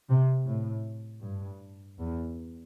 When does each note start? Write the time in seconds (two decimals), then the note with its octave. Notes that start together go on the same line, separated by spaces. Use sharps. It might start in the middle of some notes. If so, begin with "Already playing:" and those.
0.09 C3
0.46 A2
1.23 G2
1.99 E2